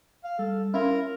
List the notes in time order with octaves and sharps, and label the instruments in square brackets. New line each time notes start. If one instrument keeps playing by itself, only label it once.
[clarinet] F5
[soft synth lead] G3 [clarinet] A4
[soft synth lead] C#4 [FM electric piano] E4 F4 [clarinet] A#4